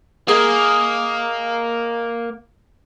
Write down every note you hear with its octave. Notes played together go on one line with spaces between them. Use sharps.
A#3 G#4 D#5